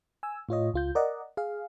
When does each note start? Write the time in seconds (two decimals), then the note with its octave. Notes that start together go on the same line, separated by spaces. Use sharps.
0.23 G#5 E6
0.49 A2 F4 C#5 D#5
0.74 C#2 F4 G6
0.95 A#4 D5 D#5 F#5
1.37 G#4 F5